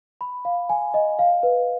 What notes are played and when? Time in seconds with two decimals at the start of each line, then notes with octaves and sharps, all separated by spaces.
0.21 B5
0.45 F5
0.69 G#5
0.94 D#5
1.19 F5
1.43 B4